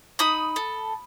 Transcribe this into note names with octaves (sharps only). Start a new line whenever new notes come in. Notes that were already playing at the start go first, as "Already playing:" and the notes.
D#4 B5 D#6
A4